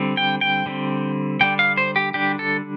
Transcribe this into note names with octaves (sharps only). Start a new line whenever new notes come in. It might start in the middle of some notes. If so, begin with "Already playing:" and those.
Already playing: D3 G3 C4
G5
G5
D3 G3 C4
D3 G3 D4 G5
F5
C5
G4
D3 G3 D4 G4
A4